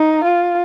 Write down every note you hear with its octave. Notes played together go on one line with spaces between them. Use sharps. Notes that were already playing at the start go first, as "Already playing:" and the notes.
Already playing: D#4
F4